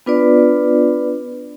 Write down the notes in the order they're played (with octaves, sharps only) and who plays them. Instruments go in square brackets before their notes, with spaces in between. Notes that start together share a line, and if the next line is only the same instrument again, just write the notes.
[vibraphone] B3 D4 F4 B4 D5